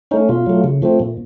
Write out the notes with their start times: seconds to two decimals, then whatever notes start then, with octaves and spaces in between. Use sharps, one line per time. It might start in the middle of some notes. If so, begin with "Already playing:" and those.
0.11 A3 C#4 D#4
0.29 B2 F4
0.46 F#3 A3
0.64 C#3
0.82 F3 A3 C4
1.00 A#2